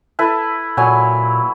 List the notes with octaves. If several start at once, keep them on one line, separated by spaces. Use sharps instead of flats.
E4 A4 B4
A#2 F#3 G#5